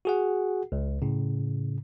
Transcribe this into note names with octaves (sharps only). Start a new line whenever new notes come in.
F#4 G#4 F#5
C#2
A2 C#3